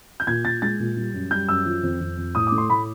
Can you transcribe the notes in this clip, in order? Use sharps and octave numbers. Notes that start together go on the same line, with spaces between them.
G6
A#2 G#6
A#2 A6
G#3 A6
A#2
G3
F#2
G3 G6
F#2 E6
F3
F2
F2
F2
A2 D#6
D6
A3
C6
A2 B5